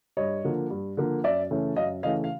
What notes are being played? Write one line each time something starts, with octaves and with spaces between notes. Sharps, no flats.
G2 C#5 D#5
D3 F3 A#3
G2
D3 F3 A#3
F#2 D5 E5
C#3 E3 A3 C#4
F#2 D#5 F5
C#3 E3 A3 C#4 D#5 F5
F5